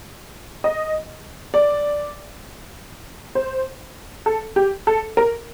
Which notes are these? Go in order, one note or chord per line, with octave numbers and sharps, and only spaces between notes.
D#5
D5
C5
A4
G4
A4
A#4